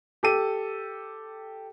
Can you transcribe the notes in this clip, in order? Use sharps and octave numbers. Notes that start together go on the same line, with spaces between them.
G4 A4 D#7